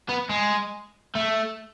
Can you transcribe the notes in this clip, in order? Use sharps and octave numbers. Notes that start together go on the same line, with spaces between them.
B3
G#3
A3